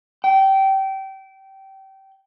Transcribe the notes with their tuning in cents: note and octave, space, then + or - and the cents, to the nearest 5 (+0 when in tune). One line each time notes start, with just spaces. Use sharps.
G5 -20